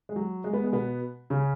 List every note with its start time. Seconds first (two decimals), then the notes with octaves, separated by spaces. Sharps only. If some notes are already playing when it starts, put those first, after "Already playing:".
0.09 G#3
0.16 F#3
0.44 G#3
0.53 B3
0.64 G#3
0.73 B2 B3
1.30 C#3 C#4